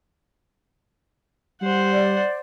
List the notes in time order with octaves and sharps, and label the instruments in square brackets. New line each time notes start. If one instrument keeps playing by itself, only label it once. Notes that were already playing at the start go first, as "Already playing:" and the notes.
[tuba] G3 [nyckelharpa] C5 F#5
[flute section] D5